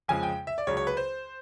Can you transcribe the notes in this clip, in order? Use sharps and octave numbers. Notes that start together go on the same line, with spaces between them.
F2 C#3 F3 G#3 G#5
G5
E5
D5
C#2 C#3 F#3 C#5
C#5
B4
C5